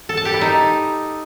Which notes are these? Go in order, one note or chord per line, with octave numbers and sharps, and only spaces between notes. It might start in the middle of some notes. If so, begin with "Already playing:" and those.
A4
A5
G4
E4
D#4